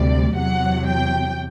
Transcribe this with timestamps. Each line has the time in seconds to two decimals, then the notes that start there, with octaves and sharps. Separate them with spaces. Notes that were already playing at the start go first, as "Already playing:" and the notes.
Already playing: D2 C3 G3 D5
0.36 E2 C3 F#3 F#5
0.87 G5